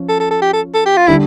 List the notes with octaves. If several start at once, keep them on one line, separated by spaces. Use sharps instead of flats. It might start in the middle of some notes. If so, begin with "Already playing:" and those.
Already playing: F3 C#4
A4
A4
A4
G4
A4
A4
G4
F4
D3 G3 D4 E4